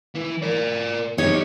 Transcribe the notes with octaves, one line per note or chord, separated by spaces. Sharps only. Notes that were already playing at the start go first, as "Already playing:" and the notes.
E3 E4
A#4 D5
B3 D#4 G4 C#5